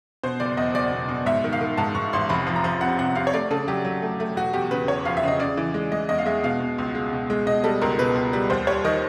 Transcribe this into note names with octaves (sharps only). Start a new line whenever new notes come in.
B2 C5
F#1 D5
E2 D#5
F#1 D5
B2
B2
G#2 E5
D#3
F5
D#3
G#2 A5
G#2 C#6
A1 C6
F1 B5
F3
A#5
F3
C3 F#5
C3 F#5
C3 F5
C#5
A3 D5
C#3 A4
F#3 G4
F#3
A3
A3
E1 F#4
E2 G4
C#3 B4
E1 C#5
F3 F5
E5
C#3 D#5
C#3 D5
E3
G#3
G#3 D#5
E2 D#5
F5
G#3 E5
B2 F5
B2
C#2
G#3
B2
G#3
B2 D#5
G3 A4
C#2 A#4
B2 B4
C#2
G3
D#2 C5
G3 C#5
D#3 D#5